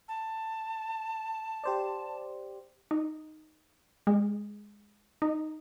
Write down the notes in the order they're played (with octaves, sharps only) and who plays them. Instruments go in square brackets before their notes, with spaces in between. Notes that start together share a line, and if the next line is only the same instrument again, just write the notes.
[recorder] A5
[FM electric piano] G4 C5 D5
[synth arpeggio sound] D#4
G#3
D#4